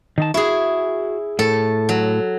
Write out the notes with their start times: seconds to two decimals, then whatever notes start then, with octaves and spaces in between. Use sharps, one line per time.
0.18 D#3 D#4 A5
0.34 E4 F#4 G#4
1.39 A2 A4
1.89 F#3